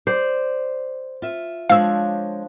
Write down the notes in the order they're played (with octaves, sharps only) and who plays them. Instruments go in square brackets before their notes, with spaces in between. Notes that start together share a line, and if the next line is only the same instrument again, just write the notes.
[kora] C5 [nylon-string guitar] D5
[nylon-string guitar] F4 E5
[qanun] F3 D4 [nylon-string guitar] G#3 C#5 [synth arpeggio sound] F5 E6